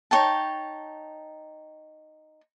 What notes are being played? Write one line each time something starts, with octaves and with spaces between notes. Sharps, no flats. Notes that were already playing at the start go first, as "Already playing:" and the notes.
D#4 C#5 G5 A5